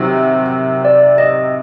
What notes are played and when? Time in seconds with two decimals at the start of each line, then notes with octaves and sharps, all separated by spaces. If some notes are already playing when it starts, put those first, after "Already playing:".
Already playing: C3 D#3 F#3
0.85 D5
1.18 D#5